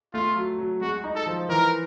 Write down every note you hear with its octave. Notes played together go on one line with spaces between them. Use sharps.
A3 F4
F#3
F#3
G#3 F#4
D#4
A4
F3
E3 A#4